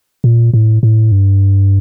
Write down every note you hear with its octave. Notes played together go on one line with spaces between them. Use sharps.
A#2
A2
A2
G2